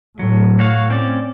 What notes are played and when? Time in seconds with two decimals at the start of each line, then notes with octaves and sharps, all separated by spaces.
0.19 A2 F#3
0.59 F#4 C#5 F5
0.90 C4 C#4 D5